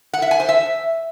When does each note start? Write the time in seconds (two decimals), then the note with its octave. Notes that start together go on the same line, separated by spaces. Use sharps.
0.13 F#5
0.22 E5
0.31 G#5
0.40 C5
0.49 E5